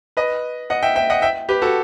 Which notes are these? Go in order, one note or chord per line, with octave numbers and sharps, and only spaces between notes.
B4 D#5
D#5 F#5
E5 G5
E5 G5
D#5 F#5
E5 G5
G4 B4
F#4 A4